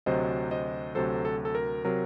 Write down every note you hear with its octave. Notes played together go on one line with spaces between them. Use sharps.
D2 C3 F#3 C5 D#5
C5 D#5
D2 C3 F#3 A4 C5
A4
A4
A#4
C3 F#3 A#4